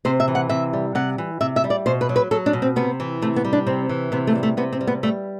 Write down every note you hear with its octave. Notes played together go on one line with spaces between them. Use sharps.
C3 C5
E5
E3
F#5
C3 E5
G3
C3 F#5
E3
C3 E5
E5
G3
D5
B2 C5
B4
F#3
B4
F#3 A4
D4
B2
C4
C3 B3
E3
C3 A3
B3
G3
D4
C3 C4
E3
C3 B3
A3
G3
A3
C3 B3
C4
G3
B3
G3 A3